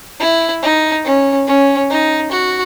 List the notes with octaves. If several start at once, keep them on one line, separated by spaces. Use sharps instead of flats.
E4
D#4
C#4
C#4
D#4
F#4